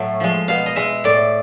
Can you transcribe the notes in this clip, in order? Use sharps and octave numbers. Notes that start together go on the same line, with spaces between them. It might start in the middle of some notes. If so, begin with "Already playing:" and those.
Already playing: A2 F#3 A3
F3 G#3
B2 F5
D#5
G#3 E5
A2 D5